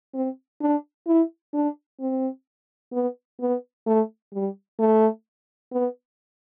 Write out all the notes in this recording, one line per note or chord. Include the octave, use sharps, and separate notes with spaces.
C4
D4
E4
D4
C4
B3
B3
A3
G3
A3
B3